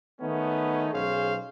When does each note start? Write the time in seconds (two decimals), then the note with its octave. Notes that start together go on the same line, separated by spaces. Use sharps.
0.21 D#3 A3 B3 C#4 D#4
0.93 B1 C#4 G#4 C5 F5